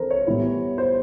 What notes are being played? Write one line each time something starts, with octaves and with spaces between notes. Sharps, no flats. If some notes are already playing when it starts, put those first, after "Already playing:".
Already playing: E3 C4 A4 A#4 C5
C#5
A2 E3 G3 B3 E4
C5